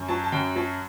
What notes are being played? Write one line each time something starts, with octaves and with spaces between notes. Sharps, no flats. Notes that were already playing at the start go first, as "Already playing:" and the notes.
Already playing: F#2
F#3 A5
A5
F#2 G5
F#3 A5